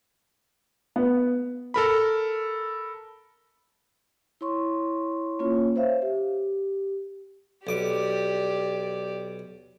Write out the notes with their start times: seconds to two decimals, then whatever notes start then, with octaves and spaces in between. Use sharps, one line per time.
0.96 B3
1.74 A4 A#4 B5
4.41 E4 C#5 C6 C#6
5.39 A#3 C#4 F4 C#5
5.76 C5 C#5 E5 F5
6.02 G4
7.67 B1 G4 D5 D6